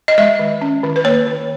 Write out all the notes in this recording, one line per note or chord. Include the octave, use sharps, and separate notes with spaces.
D#5
G#3 E5
D#3
C#4
D#3
B4
A#3 C#5
D#3